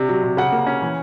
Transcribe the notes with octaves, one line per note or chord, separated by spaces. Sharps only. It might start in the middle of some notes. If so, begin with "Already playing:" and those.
Already playing: C3 D4
F#3
C3
C#3 F#5
A#3
C#4
E3